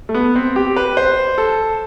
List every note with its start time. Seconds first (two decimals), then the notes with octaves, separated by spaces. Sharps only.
0.09 A3
0.14 B3
0.36 C4
0.56 G4
0.77 B4
0.97 C5
1.38 A4